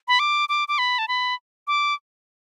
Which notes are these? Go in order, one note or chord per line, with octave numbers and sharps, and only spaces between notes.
B5
D6
D6
D6
B5
A5
B5
D6